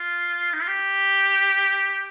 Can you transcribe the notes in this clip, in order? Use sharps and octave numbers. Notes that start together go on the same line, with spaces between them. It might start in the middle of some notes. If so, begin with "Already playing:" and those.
Already playing: F4
D#4
F4
G4